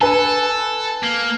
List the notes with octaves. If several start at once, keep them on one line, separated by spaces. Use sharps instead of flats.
A4 B4 G#5
A#3